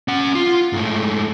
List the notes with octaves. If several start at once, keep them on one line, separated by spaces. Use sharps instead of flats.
C#4 F#5
F4
G#2 A3